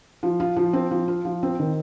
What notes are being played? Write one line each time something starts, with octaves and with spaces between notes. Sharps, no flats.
F3
F4
F3
C4
F3
F4
F3
C4
D#3